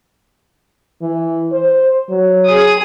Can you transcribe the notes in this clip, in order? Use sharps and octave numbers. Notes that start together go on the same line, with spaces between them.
E3
C5
F#3
G#4 D#6